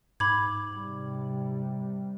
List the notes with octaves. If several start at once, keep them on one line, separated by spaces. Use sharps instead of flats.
G#2 B5 D6 G#6
C3 G3